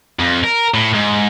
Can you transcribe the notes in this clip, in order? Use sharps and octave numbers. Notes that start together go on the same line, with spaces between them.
F2
A#4
A2
G#2